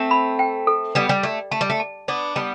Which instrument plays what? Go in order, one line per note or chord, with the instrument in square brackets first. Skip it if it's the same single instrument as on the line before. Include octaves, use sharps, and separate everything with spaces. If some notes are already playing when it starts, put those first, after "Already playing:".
Already playing: [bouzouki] A3 C4
[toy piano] B5
G5
A4
[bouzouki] G3 B3 [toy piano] D5
[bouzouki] G3
[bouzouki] A3 [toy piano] D5
[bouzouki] A3 [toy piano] A5
[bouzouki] G3
A3
[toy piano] A5
[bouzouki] B3 D4 [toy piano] D5
[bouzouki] G3 B3 [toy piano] A5